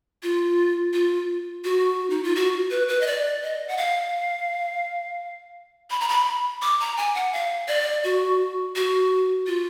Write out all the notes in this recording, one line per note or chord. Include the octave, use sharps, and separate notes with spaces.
F4
F4
F#4
D#4
F4
F#4
B4
B4
D#5
D5
D#5
F#5
F5
B5
A#5
B5
D6
A#5
G#5
F#5
F5
D5
F#4
F#4
F4